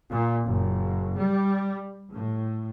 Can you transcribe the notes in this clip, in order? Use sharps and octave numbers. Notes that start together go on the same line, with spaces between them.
A#2
F#1
G3
A2